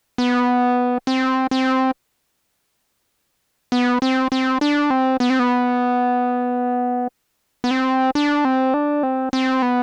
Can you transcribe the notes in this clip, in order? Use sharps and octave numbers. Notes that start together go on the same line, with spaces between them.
B3
C4
C4
B3
C4
C4
D4
C4
B3
C4
B3
B3
C4
D4
C4
D4
C4
C4
B3